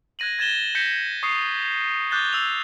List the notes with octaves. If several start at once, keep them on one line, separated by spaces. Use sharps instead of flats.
F#6 G#6 A#6 D#7 F#7
G#6 A6 E7 G7
G6 A#6 B6 C#7 E7
C#6 D#6 C7 C#7
D6 F#6 G6 A6 G7
E6 F7